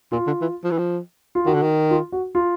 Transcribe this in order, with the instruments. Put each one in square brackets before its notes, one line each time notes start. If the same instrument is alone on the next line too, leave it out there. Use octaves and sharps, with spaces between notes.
[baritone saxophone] A#2 [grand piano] F4
[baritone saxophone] D3
E3
F3
E3
F3
[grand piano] F4
[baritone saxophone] D#3 [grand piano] F#4
[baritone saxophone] D3
D#3
[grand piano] F4
F#4
F4